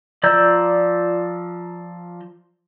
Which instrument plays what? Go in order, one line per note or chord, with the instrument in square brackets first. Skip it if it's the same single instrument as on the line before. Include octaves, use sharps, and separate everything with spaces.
[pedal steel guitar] F3 D5 A#5 E6 G6